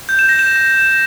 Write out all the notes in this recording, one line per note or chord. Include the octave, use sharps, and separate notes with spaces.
G6
E7
A#6
E7